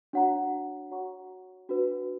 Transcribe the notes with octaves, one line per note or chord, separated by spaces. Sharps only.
D4 F#4 C#5 F#5 A#5
F#4 C#5 F#5 A#5 C#6
D4 F#4 B4